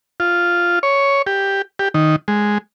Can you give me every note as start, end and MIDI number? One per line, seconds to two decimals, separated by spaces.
0.20 0.79 65
0.83 1.22 73
1.27 1.62 67
1.79 1.88 67
1.94 2.16 51
2.28 2.58 56